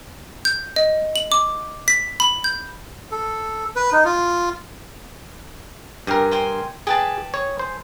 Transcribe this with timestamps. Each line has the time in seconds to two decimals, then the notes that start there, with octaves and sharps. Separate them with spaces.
0.45 G6
0.76 D#5
1.16 F#7
1.32 D6
1.88 B6
2.20 B5
2.44 G6
3.11 A4
3.76 B4
3.92 D#4
4.05 F4
6.07 G2 G4 G#4 A#4
6.31 C5 G5 G#5
6.87 G4 G#4 B4 A5
7.34 G#4 C#5
7.59 C5